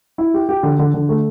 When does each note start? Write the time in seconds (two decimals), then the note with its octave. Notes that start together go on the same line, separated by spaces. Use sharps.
0.18 E4
0.34 G4
0.49 G4
0.63 D3
0.79 D3
0.94 D3
1.09 A3